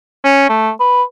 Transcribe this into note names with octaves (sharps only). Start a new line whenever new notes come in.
C#4
A3
B4